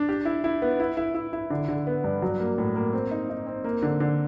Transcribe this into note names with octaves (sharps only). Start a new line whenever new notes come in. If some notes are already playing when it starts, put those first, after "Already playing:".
Already playing: D4
G4
E4
E4
B3
E4
E4
E4
E4
D3
D3
B3
G2
F#3
A#3
A2
A#3
C4
D#4
D#4
C4
A#3
D3
D3